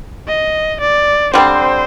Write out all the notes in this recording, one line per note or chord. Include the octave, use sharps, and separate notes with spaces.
D#5
D5
D3 G3 C4 C5